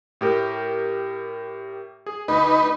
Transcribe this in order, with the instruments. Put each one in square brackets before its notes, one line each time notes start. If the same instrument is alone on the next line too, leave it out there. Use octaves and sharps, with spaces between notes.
[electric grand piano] A2 G4 A#4
G#4
[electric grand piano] D2 [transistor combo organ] D#4 B4